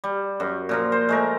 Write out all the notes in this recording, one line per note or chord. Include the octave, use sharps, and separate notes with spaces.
G3
F#2
A#2 F3 A#4
C5
G#3 A3 A#4